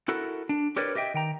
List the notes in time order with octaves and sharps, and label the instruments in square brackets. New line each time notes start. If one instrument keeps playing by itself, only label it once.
[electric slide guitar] E4 F#4 A4 A#4
D4
G4 A#4 B4 C#5 D5
G4 D#5 E5 G5
D#3 G5 A#5